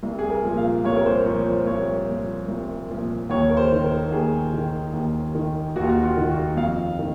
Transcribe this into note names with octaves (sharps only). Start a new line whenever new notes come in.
C2
G#4
A#4
A#2 F3
F5
C2 C#5
A#4
C5
A#2 F3 C#5
C5
C2 C#5
A#2 F3
C2
A#2 F3
D#2 C#5
A#4
C5
D#3
A#4
D#2 G#4
D#3
D#2
D#3
D#2 F#4
F4
F#4
F4
D#3
F#4
F2 F5
D#3